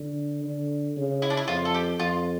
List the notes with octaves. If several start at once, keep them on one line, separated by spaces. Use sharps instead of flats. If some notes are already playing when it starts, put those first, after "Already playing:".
Already playing: D3
D3
C#3
E4
D4
E4
F2 F4
A4
G4
F2 F4